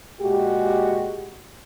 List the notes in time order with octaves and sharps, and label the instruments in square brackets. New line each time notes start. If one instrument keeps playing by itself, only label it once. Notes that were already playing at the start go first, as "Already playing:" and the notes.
[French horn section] A#2 G#3 F#4 G4